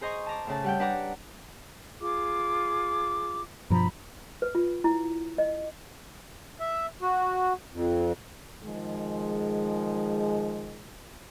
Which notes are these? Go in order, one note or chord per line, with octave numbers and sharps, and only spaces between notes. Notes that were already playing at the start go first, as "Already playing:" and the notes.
G#4 C5 D#5 A#5 C6 C#6
A5 A#5 D6
A2 C#3 A5
G3 F#5 G5
D4 B4 D5 F#5 A#5 D6
F4 G#4 D6
G2 B2 F3 A#5 B5
B4
F4
E4
D#5
E5
F#4
F2
D#3 F3 G#3